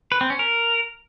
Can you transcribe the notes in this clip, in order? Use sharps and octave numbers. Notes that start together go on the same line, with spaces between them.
B4
C4
C#4
A#4